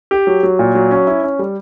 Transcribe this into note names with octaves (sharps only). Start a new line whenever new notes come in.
G4
F#3
F#3
A#2
F#3
C#4
E4
C#4
G3